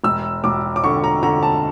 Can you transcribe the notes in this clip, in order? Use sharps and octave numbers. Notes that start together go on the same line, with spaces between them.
E1 E6
E1 D6
D6
D3 C#6
A#5
D3 A#5
A5